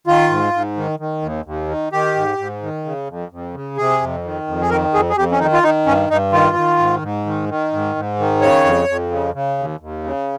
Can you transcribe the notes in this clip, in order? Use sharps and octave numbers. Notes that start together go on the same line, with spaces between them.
D#3 F4
G#2
G#2
D#3
D#3
D#2
D#2
D#3
D#3 G4
G#2
G#2
D#3
C#3
F2
F2
C#3
C3 G#4
F2
D#3
F2
G#4
D#3 A#4
F2 G#4
G#4
F2 G4
C#4
D#3 D#4
F4
D#3 D#4
G2 C#4
G2 D#4
D#3 F4
D#3
G#2
G#2
D#3
D#3
G#2
G#2
D#3
C#3 C#5
F2
F2
C#3
C#3
D#2
D#2
C#3